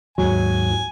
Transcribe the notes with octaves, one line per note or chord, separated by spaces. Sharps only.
D#2 G#2 F#3 G#5